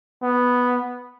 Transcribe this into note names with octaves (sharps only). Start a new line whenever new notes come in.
B3